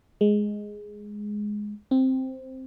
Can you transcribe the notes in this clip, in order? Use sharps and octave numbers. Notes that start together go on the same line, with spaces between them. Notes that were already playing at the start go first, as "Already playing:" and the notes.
G#3
C4